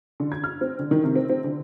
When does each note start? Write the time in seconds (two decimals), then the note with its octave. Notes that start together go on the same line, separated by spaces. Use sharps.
0.20 D3
0.32 G#6
0.44 F6
0.61 C4
0.79 D3
0.91 D#3
1.03 C3
1.16 C4
1.30 C4
1.44 D3